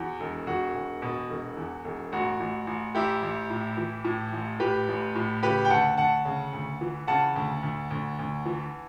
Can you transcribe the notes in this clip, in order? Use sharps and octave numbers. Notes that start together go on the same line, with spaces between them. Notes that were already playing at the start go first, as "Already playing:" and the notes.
Already playing: E2 F#4
E1
E1 F#4
E1
B2
E1
E2
E1
A1 F#4
A1
A1
A1 E4 G4
A1
A2
E3
A2
A1
A2 G4 B4
A1
A2
C#3 G4 B4
G5
D2 F#5 A5
D2 F#5 A5
C#3
D2
E3
C#3 F#5 A5
D2
D2
D2
D2
E3